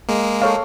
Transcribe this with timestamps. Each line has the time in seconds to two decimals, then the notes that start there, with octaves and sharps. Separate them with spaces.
0.09 G#3 A#3
0.42 A4 C#5 F5